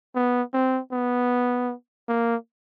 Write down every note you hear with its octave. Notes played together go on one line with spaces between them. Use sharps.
B3
C4
B3
A#3